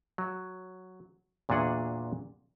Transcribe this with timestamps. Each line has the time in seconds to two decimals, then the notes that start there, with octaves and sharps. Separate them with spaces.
0.18 F#3
1.49 E2 A#2 F#3 D4 G#4 F#5